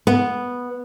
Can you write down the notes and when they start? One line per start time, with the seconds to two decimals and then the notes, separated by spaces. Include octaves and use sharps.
0.07 B3